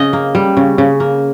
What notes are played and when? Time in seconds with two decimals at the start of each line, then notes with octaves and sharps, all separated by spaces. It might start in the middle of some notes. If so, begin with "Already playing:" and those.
Already playing: C#3 D#5
0.13 A#3
0.35 G3
0.57 C#3
0.78 C#3
1.00 A#3